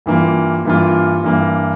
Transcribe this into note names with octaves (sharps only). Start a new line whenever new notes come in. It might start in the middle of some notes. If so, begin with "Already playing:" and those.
G2 E3 A#3 F4
G2 E3 A#3 F4
G2 E3 A#3